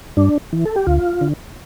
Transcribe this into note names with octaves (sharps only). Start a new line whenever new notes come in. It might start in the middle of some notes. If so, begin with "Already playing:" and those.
G2 D4
E3
A4
G4
D2 F4
D3